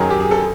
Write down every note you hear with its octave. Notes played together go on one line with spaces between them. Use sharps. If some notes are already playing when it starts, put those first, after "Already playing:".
Already playing: F#2 D#3 F#3 G#4
G4
G#4
A4